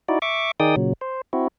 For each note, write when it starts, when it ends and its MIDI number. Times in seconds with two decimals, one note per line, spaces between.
0.09 0.19 63
0.09 0.19 64
0.09 0.19 66
0.09 0.19 74
0.22 0.51 76
0.22 0.51 85
0.22 0.51 86
0.60 0.76 51
0.60 0.76 63
0.60 0.76 68
0.60 0.76 74
0.60 0.76 79
0.60 0.76 87
0.76 0.93 46
0.76 0.93 49
0.76 0.93 54
1.01 1.21 72
1.33 1.48 60
1.33 1.48 64
1.33 1.48 66